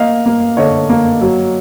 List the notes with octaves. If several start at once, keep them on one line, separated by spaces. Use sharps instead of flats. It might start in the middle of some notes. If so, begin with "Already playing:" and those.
Already playing: A#3 D#5 F5
A#3
D3 C#5 D#5
A#3
F#3